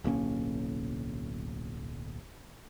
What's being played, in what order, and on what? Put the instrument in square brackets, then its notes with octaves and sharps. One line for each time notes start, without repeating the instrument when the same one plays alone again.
[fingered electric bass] D1 B1 A#3 C#4